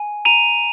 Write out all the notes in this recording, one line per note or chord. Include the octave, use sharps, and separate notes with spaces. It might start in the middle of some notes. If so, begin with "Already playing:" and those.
Already playing: G#5
A#5 D#7 F7